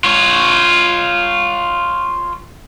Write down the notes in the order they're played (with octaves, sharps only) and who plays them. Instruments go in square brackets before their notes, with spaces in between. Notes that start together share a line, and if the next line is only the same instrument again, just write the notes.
[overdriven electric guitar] F4 C#5